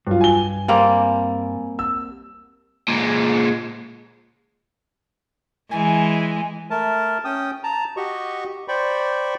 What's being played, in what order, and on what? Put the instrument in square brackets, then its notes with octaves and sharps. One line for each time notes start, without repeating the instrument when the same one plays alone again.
[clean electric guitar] G2 [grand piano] F#3 F4
[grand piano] G#5 G7
[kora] G3 A#3 C4
[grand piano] E6
[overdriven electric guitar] A#2 G#3
[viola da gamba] E3 G#3 [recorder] G#5
[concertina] A3 A#4 A5
C#4 G5 D#6
A5 A#5
F#4 G4 D#5 C#6
C5 D5 G5 B5 C#6